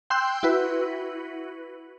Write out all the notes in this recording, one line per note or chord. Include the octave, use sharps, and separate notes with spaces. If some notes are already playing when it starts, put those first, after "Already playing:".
G5 C6 E6 F#6 G6
E4 F#4 B4